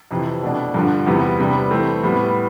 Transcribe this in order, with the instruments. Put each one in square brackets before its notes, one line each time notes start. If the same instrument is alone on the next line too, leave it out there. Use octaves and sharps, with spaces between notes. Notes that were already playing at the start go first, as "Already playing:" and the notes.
[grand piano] F2 C3 E3
B2 A3 D4
G2 D3 F3
E2 C3 G3 B3
C3 G3 B3 D4
E3 A3 C4
A2 G3 B3